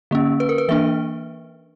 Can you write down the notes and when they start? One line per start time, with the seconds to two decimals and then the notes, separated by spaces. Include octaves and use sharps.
0.11 D3 A#3 C#4
0.40 B4
0.49 A#4
0.58 B4
0.69 E3 A#3 D4 E5